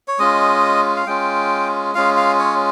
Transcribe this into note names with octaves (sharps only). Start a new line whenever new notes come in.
C#5
G#3 C#4 F4 D#5
F5
G#3 C#4 F4 G5
G#3 C#4 F4 F5
F5
C#5